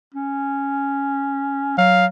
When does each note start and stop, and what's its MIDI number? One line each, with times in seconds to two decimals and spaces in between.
0.15 1.75 61
1.78 2.07 54
1.78 2.06 77